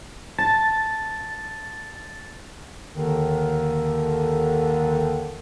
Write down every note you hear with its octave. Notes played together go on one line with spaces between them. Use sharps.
A5 A6
D#2 D3 D#3